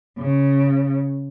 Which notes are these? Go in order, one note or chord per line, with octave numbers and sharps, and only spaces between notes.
C#3